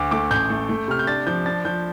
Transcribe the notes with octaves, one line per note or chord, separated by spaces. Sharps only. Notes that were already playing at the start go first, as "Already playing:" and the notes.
Already playing: D2 D6
A3 D6
A1 G6
A3
A3
C3 F6
G6
D4 A6
F3 G6
D4 A6
F3 G6